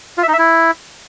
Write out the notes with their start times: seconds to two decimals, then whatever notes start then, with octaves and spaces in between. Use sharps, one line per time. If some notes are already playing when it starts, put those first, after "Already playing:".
0.18 F4
0.23 E5
0.28 D#4
0.33 E5
0.39 E4